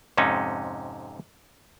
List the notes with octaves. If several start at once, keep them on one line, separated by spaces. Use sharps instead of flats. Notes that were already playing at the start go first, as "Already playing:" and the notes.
F2 G#2 C3 C#4 D#4